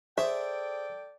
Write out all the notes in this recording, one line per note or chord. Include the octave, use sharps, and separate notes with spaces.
G#4 A4 C5 D5 E5 G5